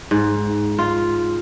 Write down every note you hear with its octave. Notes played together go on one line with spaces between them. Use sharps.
G#2
F4